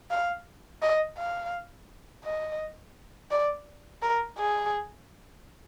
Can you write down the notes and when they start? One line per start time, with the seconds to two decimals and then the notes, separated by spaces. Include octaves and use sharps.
0.10 F5
0.82 D#5
1.17 F5
2.24 D#5
3.31 D5
4.02 A#4
4.38 G#4